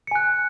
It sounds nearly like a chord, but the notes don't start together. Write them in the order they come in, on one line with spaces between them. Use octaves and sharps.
C#7 G#5 F#6